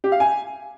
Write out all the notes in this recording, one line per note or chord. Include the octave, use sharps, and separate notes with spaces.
G4
F5
G#5